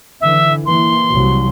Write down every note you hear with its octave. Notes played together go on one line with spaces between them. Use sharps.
D3 E3 E5
E3 A#3 C6
C2 F#3